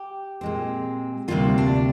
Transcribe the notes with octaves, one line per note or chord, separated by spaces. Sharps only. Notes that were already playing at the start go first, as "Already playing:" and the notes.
Already playing: G4
A#2 G#3 C4
D2 C3 G3 A#3 F4
D4